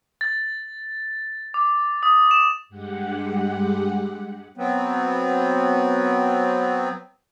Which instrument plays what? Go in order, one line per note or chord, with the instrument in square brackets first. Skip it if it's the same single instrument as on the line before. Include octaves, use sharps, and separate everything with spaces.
[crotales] A6
D6
D#6
E7
[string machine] G2 G#3 G4 F#5
[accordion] F#3 B3 C4